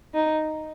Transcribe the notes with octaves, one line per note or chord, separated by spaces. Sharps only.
D#4